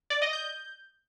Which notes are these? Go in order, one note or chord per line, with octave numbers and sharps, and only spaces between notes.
D5
D#5
G6